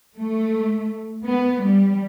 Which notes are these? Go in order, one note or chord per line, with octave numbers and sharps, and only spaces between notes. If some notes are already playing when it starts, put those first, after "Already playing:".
A3
B3
G3